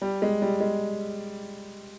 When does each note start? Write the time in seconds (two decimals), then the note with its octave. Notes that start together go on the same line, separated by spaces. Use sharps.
0.02 G3
0.22 G#3
0.42 G3
0.61 G#3